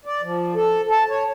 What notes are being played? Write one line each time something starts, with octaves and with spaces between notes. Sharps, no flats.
D5
F3
A4
A5
C#5